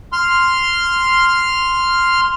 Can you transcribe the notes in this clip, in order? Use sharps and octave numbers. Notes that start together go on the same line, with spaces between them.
C6 F6